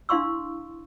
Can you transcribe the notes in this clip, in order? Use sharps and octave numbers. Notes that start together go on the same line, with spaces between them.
D4 E4 F5 C6 C#6 E6